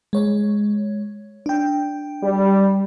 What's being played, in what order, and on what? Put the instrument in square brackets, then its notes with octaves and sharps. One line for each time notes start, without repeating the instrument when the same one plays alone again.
[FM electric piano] G#3 C#5
D4 G5
[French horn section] G3